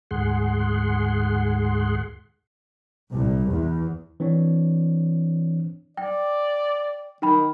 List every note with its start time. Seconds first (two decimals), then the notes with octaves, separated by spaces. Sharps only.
0.11 D2 G#2 G#4 F#5 C6
3.13 C2
3.50 E2
4.20 E3 C4 D4 C#5
5.97 D5 G5
7.22 D#3 D#4 G5 B5